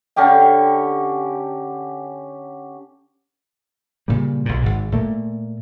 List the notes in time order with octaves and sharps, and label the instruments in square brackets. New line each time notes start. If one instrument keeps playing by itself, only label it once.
[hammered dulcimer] D3 C#4 G4 G5
[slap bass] A#2 C#3 G3
B1 A#2
G#1 G#2
A#2 A3 A#3